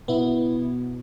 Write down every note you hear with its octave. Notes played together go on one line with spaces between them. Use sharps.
B2 B3 E4